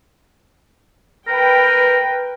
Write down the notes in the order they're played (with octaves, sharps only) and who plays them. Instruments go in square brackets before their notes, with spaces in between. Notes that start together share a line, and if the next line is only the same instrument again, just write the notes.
[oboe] A#4 [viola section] B4 G5